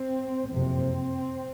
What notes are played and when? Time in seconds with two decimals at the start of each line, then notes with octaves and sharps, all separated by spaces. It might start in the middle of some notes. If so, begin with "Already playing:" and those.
Already playing: C4
0.52 F#1 F2 C3 C4